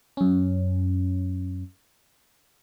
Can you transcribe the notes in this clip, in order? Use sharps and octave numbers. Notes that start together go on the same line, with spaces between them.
F#2 C#4